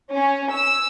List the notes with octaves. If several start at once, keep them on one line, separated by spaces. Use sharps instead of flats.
C#4
E6